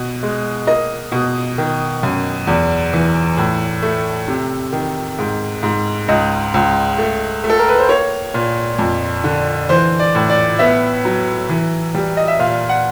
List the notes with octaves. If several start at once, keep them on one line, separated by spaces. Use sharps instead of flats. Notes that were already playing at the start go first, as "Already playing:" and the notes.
Already playing: B2
G#3
A#3 D#5
B2
D#3
F#2
E2
E3
A2
A3
C3
D#3
G#2
G#2
C#2 D#5
C#2
A3
A3
A4
A#4
B4
C5
A#3 C#5
A#2
F2
D3
E3 C5
D5
A2
D5
B3 E5
F#3
E3
G3
D#5
E5
A#2 F5
F#5